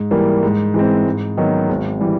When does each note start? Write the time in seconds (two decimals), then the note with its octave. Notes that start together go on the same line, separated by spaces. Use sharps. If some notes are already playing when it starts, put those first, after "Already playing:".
Already playing: G#2
0.11 E3 G3 A#3
0.43 G#2
0.74 E3 G#3 C4
1.06 G#2
1.37 D#3 F#3 B3 D#4
1.69 G#1
2.00 E3 G3